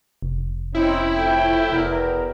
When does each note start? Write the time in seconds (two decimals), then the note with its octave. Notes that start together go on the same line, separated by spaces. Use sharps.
0.22 F1
0.75 C4 C#4 D#4 E4
1.16 A2 F3 G5
1.71 F1 E2 B2 A#4